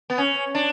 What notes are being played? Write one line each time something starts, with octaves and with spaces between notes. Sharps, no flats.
B3
C#4
D4